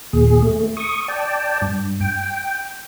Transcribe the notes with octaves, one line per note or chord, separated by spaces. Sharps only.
D#2 A#2 G#4
A3
C#6 D#6
D5 G5 A5
G2
G5